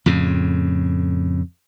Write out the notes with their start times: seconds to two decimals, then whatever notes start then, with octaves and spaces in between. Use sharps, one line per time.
0.06 F2 A2 C#3